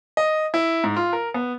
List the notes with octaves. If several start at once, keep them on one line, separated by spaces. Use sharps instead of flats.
D#5
E4
G#2
F4
A#4
B3